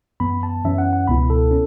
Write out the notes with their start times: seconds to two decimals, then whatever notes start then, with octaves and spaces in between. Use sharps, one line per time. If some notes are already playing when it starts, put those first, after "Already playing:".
0.20 F#2 E3 B3 B5
0.43 A5
0.64 F#2 E3 C#4 E5
0.78 F#5
0.93 F#5
1.07 C#2 B2 B3 E4 B5
1.30 A4
1.51 C#4